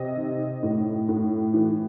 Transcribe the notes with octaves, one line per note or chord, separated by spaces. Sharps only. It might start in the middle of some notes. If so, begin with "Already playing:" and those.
Already playing: C3 D#5
D#3
A2
A2
E3